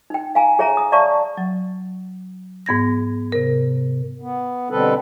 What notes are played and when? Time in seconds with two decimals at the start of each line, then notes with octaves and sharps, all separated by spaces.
0.10 D#4 G5
0.35 F5 G#5 A#5
0.59 G#4 C#5 E5 G#5 A#5
0.77 D#6
0.92 C#5 D5 E5 F5 A5 C#6
1.38 F#3
2.66 G#2 B3 G#6 A#6
3.32 C3 A#4
4.21 B3
4.70 B2 D3 G3 C4 A4 B4